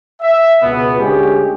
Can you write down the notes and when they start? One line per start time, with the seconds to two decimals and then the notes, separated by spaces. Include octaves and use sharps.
0.22 E5
0.63 C#2 B2 B3
0.99 D2 G#3 C#4 G4